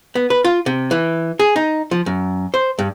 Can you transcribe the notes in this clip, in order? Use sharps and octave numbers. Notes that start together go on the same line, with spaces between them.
B3
B4
F4
C3
E3
G#4
D#4
F3
F#2
C5
G2